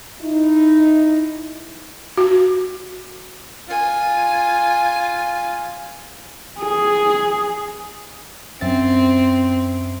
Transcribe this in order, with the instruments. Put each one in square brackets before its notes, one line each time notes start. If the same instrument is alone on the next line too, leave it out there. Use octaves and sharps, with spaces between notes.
[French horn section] D#4 E4
[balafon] F#4
[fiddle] F4 G#5
[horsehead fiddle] G#4
[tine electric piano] F#2 E5 A6 [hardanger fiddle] C4